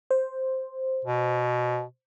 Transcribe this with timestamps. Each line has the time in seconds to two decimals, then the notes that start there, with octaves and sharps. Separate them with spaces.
0.10 C5
1.05 B2